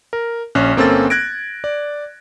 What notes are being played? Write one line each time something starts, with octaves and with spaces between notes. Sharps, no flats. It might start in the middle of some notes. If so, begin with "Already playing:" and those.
A#4
A#1 C#4 F#6
G1 A#3 C4 C#4 A4 A6
F#6 G#6 A#6 D7
D5